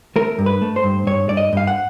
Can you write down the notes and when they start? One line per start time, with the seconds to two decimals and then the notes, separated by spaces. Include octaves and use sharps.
0.16 A3 A#4
0.39 G2
0.46 B4
0.62 A3
0.76 C5
0.84 G2
1.07 G2 C#5
1.29 G2 D5
1.37 D#5
1.53 G2 F5
1.67 F#5